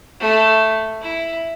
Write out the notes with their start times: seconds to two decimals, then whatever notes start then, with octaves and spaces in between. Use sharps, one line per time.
0.20 A3
1.01 E4